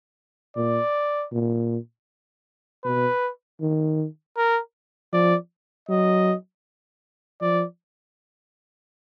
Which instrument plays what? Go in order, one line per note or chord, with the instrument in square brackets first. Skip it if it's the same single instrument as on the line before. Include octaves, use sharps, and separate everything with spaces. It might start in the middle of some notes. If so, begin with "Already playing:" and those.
[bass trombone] A#2 [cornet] D5
[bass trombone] A#2
[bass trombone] B2 [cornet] B4
[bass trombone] D#3
[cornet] A#4
[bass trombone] F3 [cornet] D5
[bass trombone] F#3 [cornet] D#5
[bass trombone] F3 [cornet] D5